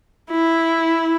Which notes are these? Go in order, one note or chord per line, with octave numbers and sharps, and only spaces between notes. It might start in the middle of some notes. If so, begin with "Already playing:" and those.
E4